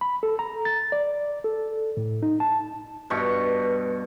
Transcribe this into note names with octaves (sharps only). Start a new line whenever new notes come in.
B5
A4
A#5
A6
D5
A4
A2
D#4
A5
G2 B2 C#6